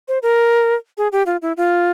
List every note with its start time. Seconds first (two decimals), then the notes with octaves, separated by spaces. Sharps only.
0.08 C5
0.22 A#4
0.98 G#4
1.12 G4
1.26 F4
1.42 E4
1.57 F4